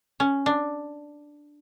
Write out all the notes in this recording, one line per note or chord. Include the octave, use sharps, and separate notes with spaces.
C#4
D4